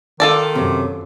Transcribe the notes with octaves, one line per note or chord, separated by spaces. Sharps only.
D#3 F4 A4 D5
F#2 C3